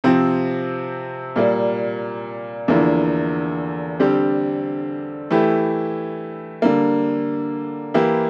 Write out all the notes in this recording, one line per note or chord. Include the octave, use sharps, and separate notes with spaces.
C3 F3 C4
A#2 G3 A#3
E2 D3 F3 A#3 E4
D3 G3 C4 G4
E3 A3 E4 G4
D3 G3 A#3
E3 A#3 E4 G4